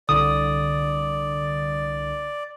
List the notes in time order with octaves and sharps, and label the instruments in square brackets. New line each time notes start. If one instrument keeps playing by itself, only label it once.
[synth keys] C2 D3 [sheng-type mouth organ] D5 [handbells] D#6